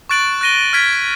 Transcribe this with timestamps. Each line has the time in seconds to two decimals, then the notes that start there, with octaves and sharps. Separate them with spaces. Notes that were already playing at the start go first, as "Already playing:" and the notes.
0.09 C#6 F#6 A6 D7 F#7
0.41 F#6 A#6 D#7 G7
0.73 F6 G#6 B6 D7